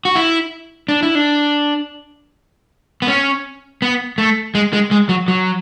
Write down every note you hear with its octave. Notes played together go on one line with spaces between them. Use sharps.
F#4
E4
D4
E4
D4
B3
C#4
B3
A3
G#3
G#3
G#3
F#3
F#3